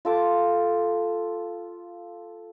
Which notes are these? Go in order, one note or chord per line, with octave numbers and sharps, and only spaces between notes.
F4 A4 D6